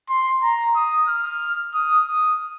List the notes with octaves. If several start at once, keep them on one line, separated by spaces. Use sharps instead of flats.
C6
A#5
D#6
F6
D#6
D#6